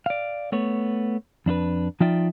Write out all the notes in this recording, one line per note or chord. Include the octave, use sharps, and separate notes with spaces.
D5 F5
A3 B3 C#5
F2 D4 E4 B4
F3 D#4 F4 D5 E5 G5